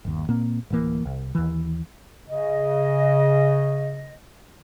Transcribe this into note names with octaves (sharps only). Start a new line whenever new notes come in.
G1 D#2
A#2 A#3 C4
D1 A1 E3 A#3
C2
D#2 E3
C#3 D#5